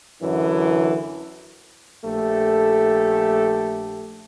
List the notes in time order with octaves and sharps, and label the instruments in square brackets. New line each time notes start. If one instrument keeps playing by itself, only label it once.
[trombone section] F#2 D3 E3
A#1 A3 G4 A4